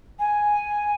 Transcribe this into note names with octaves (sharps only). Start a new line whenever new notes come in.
G#5